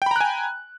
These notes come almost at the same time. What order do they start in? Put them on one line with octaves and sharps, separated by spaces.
G5 B5 A#5 F#6 G#5